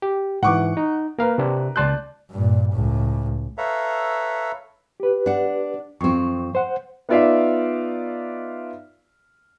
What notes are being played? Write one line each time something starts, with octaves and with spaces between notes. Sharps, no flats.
G4
G#2 E3 F#5 C#6 D6
D#4
A#3 A#4 B4 F5
C3 C4 D4
C#2 D5 A5 C6 F#6 G6
G2 A#2
C#2 A2
A4 B4 C#5 E5 F5 A#5
G4 B4
D4 F#5
F2 F3 C4 C#6
C5 F#5
B3 D#4 F4 D5 E5 F5